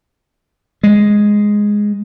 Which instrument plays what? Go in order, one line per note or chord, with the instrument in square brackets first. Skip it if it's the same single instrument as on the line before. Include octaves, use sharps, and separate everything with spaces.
[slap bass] G#3